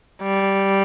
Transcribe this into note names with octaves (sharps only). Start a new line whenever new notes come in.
G3